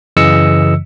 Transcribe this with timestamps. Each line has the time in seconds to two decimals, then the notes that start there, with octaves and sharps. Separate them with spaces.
0.17 F#2 C#3 E3 D#5 E6 C#7